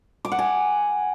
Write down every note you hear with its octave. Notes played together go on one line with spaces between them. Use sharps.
D6
F#5
G#5